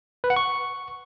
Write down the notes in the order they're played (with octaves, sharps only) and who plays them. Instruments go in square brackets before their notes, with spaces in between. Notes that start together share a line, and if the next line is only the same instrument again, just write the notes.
[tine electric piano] B4
F#5
C#6